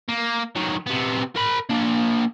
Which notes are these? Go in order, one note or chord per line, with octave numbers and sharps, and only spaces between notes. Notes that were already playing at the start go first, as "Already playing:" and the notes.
A#3
D#3 F#3
C3 B3
A#4 B5
A#3 D4